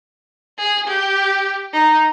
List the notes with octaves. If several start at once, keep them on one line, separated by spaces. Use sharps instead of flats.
G#4
G4
D#4